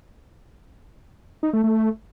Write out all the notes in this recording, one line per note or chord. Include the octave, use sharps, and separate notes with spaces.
D#4
A3
A3